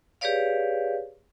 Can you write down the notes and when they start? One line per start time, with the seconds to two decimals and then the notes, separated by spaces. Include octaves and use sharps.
0.21 G4 G#4 B4 C#5 D5 F5